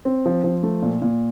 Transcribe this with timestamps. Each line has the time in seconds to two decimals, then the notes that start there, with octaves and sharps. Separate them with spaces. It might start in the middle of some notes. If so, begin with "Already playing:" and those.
0.05 C4
0.26 F3
0.44 F3
0.63 A3
0.82 A#2
1.02 A#2